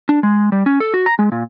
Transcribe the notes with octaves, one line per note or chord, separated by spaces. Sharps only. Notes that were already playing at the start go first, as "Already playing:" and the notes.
D4
G#3
G3
C#4
A4
F#4
A#5
G#3
A#2